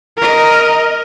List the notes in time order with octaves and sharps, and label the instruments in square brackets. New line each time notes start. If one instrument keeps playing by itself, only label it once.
[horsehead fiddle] A#4 D#5